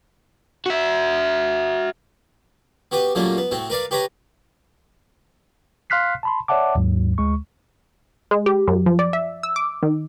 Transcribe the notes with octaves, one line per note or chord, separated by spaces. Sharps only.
F#4 E5
B3 F#4 G4 B4
F#2 A#2 G3 A3 A#3 C#4
B3
A2 C4 F#4
A#4 B4 D5 F5
G4 B4 C#5 A#5 B5
F5 C6 F6 F#6 B6 C7
A5 B5 C6
C#5 D5 E5 F#5 A5 D6
D#2 G#2 F#3
D2 G#3 C#6
G#3
G4
F#2
F3
D5
E5
E6
D6
D#3